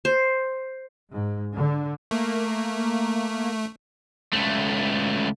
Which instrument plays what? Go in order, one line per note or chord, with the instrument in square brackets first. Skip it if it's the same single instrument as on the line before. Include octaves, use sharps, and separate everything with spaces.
[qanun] C5
[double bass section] G#2
D3
[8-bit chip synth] A3 [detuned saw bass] A#3
[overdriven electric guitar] C#2 A3